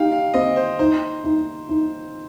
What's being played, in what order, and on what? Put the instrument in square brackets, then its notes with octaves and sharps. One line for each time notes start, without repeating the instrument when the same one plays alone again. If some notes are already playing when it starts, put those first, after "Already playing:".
Already playing: [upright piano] D#4 G4 [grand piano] F5 G5
[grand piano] F5
[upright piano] C4 [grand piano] D#5
[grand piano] C5
[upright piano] D#4 [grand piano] C5
[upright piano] D#4
D#4